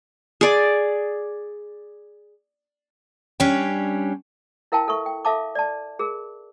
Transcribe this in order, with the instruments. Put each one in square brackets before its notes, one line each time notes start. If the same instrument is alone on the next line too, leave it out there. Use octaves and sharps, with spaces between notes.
[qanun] G#4 D5
[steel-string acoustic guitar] G3 C#4 D4 C#5 G5
[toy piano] E4 A#4 F5 G5 A5
A4 E5 C#6
G5
A4 E5 F5 A5 D6
D5 A5
G#4 A#4